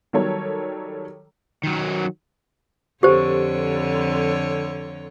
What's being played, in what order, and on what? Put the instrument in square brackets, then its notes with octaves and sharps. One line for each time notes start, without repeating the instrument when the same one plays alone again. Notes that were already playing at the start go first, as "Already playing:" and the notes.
[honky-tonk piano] D#3 F#3 G3 A4 C#5
[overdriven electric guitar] D#3 F#3
[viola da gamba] F2 D3 C#5 [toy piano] G4 C5